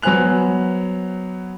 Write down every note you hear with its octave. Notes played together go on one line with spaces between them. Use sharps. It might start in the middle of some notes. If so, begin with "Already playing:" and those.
F#3 B3 C5 G#5 F#6 F7